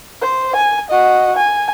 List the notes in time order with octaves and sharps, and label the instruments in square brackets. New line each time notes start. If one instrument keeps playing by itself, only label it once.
[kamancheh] C5
G#5
F#4 D#5
G#5